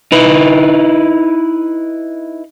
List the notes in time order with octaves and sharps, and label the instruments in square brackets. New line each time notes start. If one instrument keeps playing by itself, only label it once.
[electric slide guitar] D#4 E4 B4